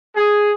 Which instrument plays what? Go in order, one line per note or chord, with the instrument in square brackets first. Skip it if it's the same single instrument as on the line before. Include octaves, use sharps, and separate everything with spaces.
[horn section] G#4